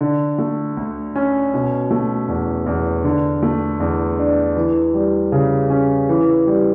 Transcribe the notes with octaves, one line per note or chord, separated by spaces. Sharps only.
D3
A3
D2
C#4
B2
A3
E2
E2
D3
A3
E2
D4
E3
G3
C#3
C#4
E3
G3